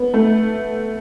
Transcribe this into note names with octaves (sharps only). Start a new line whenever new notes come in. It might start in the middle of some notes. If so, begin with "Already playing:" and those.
Already playing: B3
A3